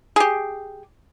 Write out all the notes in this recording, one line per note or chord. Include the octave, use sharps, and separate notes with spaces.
G4 G#4